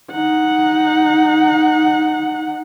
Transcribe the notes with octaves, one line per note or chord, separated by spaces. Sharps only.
D#4 F#5